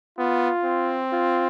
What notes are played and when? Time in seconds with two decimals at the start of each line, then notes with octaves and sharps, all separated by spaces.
0.18 B3 F4
0.64 C4
1.12 F4